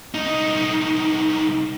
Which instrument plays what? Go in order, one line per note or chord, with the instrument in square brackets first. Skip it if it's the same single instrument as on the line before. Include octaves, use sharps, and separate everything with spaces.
[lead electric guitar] C2 D#4